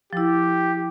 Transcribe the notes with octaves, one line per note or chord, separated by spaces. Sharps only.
F3 E4 G4